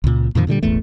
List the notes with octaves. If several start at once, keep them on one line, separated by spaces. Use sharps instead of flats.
C#2 A#2
F2 A#2 D#3 F3
A#2 D3 E3 G3
E1 A1 E2 A3